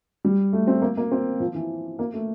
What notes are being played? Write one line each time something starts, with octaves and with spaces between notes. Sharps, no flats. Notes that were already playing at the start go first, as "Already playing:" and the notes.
G3
A3
C4
A#3
A#3
C4
F3
E3
A#3
A3